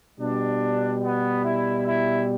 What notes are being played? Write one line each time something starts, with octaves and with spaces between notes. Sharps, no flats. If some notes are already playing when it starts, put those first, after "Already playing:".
B2 G3 D4
B3
E4
E4